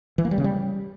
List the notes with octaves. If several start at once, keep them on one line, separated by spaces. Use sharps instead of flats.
E3
A#3
G3
C#3
G3